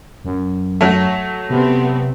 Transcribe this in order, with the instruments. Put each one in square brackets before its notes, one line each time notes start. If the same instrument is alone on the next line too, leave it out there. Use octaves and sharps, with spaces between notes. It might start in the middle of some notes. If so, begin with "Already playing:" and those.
[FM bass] F#2
[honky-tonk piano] F#3 A3
[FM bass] C3 [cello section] B3 C4